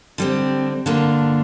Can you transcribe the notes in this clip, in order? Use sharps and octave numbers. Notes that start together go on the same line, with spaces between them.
D3 G3 C4
G2 D3 A#3 D4 F4